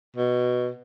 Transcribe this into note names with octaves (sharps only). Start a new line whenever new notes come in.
B2